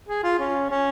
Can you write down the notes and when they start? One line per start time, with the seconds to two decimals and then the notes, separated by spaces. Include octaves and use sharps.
0.08 G#4
0.23 F4
0.39 C#4
0.70 C#4